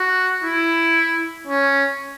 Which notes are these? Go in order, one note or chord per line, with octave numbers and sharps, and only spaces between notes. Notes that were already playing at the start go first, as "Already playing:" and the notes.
Already playing: F#4
E4
C#4